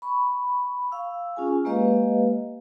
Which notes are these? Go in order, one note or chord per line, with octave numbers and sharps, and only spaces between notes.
B5 C#6
F5 E6
C#4 F4 G#4 G#5
G#3 A#3 G4 B4 D#5 F5